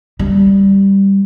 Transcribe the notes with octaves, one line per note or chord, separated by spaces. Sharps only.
G3